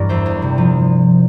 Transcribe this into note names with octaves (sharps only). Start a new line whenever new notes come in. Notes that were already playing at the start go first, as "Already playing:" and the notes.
Already playing: G2 E3 A#4 D5
E2 C5 E5
E2
C3
F3